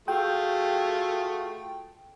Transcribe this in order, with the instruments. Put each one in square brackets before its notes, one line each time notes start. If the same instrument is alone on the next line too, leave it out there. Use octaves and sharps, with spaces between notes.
[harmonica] A3 [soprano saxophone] F4 [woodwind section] F#4 G#4 [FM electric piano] G5